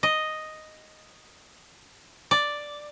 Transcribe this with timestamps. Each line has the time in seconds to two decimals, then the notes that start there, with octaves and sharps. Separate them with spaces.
0.03 D#5
2.31 D5